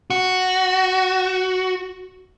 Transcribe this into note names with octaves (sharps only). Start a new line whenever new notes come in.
F#4